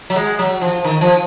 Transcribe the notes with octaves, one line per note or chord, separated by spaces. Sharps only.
F#3
G#3
F#3
F3
D#3
F3